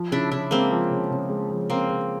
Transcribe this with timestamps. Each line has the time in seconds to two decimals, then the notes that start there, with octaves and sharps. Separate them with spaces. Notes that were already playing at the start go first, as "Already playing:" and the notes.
Already playing: F3
0.12 C#3 D4 E4
0.31 C#3 D4 E4
0.51 G#3 A#3 C4
0.71 F3
0.91 C#3
1.11 C#3
1.30 G#3
1.50 F3
1.69 C#3 A#3 C4
1.90 C#3